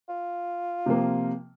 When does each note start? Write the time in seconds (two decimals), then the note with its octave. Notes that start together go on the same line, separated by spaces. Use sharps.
0.09 F4
0.86 C3 F3 A#3